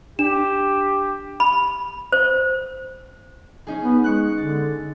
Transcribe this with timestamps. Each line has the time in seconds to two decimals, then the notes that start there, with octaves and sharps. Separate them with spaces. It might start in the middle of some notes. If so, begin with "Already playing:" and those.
0.19 D4 G4 E7
1.40 B5
2.12 C5
3.67 C#4 D#4 G#4
3.84 B3
4.04 G#3 C#6 F#6
4.38 D3 A6